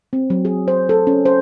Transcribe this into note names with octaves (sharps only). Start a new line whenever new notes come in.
C4
F#3
G#4
C5
A4
C#4
C5